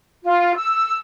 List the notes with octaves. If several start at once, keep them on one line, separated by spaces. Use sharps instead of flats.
F4
E6